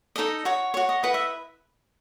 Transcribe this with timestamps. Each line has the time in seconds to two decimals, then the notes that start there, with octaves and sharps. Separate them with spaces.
0.16 D#4 A4 D#5
0.45 F#4 C#5
0.74 F#4 C#5
0.89 D#5
1.03 E4 B4 D#5 F#5
1.14 E5